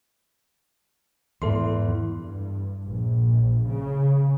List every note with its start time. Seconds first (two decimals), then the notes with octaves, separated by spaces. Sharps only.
1.42 E2 G#2 A4 C6
2.13 G2
2.86 A#1
3.67 C#3